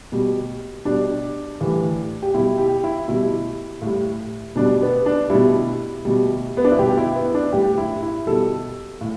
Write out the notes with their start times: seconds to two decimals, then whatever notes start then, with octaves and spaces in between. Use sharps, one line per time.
0.12 B2 G3
0.85 B2 G3 D4
1.60 A2 E3 G3
2.22 G4
2.34 B2 G3 E4
2.58 G4
2.84 E4
3.08 B2 G3 E4
3.82 A2 G3
4.56 B2 G3 D4
4.82 B3
5.06 D4
5.30 B2 G3 E4
6.05 B2 G3
6.57 B3
6.64 D4
6.72 E4
6.78 B2 G3 G4
6.98 E4
7.15 B3
7.34 D4
7.53 A2 G3 G4
7.78 E4
8.02 E4
8.27 B2 G3 A4
9.01 A2